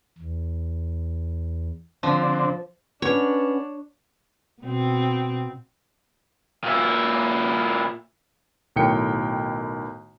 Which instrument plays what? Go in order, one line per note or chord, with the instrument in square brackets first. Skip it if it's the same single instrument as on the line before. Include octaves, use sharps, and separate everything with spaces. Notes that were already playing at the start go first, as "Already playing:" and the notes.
[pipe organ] E2
[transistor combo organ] D3 C4 [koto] F3
[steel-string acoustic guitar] C#4 B4 F#5 [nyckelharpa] D4 [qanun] C#5
[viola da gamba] B2 C4
[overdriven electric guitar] A#2 E4
[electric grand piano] B1 A2 D#3 G5 C#7